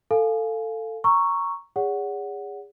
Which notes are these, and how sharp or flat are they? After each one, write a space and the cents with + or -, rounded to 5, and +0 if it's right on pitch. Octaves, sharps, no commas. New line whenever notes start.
A4 +15 F5 +0 G#5 +25
A#5 +0 C#6 +0 E6 +20
G#4 -30 C#5 +45 F#5 +0